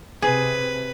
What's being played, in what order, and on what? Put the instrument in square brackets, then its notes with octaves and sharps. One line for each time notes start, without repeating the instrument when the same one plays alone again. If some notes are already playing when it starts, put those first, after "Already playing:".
[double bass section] C3 [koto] G#4 [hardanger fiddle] B4